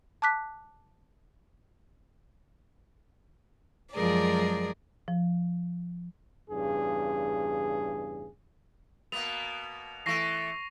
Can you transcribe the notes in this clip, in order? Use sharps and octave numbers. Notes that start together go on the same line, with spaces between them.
A5 D6 F#6 B6
F#2 F3 G#3 G#4 A#4 D5
F3
E2 G2 C#3 G#4
B2 A#3 B3 F7
E3 A3 C#6 A#6 C7